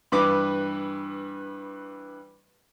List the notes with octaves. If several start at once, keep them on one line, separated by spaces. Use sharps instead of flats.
G2 E3 B4 D6